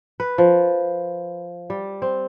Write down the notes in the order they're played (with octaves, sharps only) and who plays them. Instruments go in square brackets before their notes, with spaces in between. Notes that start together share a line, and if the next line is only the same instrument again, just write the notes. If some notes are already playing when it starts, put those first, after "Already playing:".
[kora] B4
F3
G3
C4